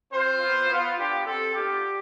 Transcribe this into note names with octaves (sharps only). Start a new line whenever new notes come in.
C4 F4 C5
B3 F4
B3 F4
B3 D4 F4 G4
C4 G4 A4
B3 D4 F4 G4